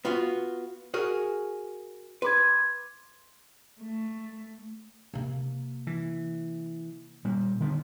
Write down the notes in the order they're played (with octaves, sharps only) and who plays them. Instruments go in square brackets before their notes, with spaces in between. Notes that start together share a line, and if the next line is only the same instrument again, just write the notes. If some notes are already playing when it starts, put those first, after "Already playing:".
[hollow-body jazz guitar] B3 F4 F#4
F#4 G#4 A#4
[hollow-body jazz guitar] B4 [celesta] C6 D6 G#6
[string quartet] A3
[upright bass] C3 A#3
[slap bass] E3
A#2 G3
D3 D#3 B3